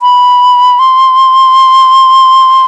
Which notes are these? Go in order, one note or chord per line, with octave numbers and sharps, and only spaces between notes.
B5
C6